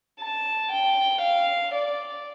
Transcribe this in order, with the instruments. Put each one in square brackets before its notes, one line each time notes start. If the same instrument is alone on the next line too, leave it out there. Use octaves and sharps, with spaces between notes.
[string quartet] A5
G5
F5
D5